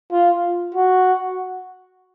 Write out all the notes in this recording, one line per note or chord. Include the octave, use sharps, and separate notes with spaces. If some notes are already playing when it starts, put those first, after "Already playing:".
F4
F#4